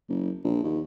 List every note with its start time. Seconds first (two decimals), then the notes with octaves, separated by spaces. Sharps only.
0.09 F#1
0.44 A#1
0.64 D#2